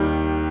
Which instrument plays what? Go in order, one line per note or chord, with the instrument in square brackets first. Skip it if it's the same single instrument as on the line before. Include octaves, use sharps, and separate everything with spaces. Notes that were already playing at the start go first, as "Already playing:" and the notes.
Already playing: [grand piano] D#2 D#3 G3